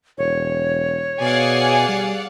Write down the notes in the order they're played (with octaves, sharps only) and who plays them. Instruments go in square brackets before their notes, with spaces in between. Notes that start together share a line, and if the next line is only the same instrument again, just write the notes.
[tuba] E1 [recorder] C#5
[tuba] B2 [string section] G#4 G#5 C7 [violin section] D5 F5 F#5
[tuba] G3